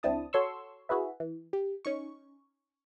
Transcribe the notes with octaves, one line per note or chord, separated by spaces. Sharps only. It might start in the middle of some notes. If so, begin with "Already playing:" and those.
C#2 C4 D4 E4 A5 D#6
F#4 A4 C#5 C6 C#6 E6
E4 F#4 G#4 B4 E5
E3
G4
C#4 D#4 C#6